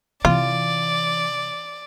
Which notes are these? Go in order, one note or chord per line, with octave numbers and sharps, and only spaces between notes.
C3 E3 F4 D5